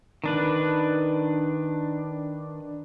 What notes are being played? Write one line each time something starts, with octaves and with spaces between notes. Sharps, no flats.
D#3 D4 B4